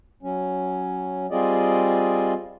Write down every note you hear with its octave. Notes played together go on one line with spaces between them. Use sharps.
F#3 C#4
G3 C4 F4 G#4 D5 D#5